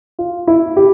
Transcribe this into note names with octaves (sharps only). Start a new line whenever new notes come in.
F4
E4
G4